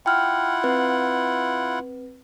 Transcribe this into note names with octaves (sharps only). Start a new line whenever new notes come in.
E4 F4 F#5 G5 F6
C4 B4